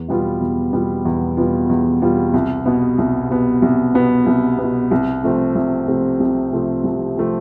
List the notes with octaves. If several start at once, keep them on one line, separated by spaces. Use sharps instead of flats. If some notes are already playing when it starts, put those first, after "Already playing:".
Already playing: E2
B2 G3 B3 F4
E2
B2 G3 B3 F4
E2
B2 G3 B3 F4
E2
B2 G3 B3 F4
C2
B2 B3
C2
B2 B3
C2
B2 B3
C2
B3
B2
C2
C3 F3 A3 C4
C2
C3 F3 A3 C4
C2
C3 F3 A3 C4
C2
C3 F3 A3 C4